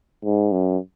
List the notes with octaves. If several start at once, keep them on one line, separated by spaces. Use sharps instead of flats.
G#2
F#2